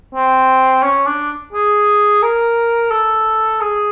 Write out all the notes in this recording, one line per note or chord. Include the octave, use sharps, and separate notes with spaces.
C4
C#4
D4
G#4
A#4
A4
G#4